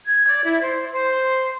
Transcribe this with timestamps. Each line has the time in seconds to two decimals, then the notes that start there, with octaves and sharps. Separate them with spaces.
0.06 G#6
0.28 D5
0.45 E4
0.60 C5
0.92 C5